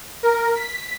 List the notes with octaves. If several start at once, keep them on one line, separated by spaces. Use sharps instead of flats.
A#4
B6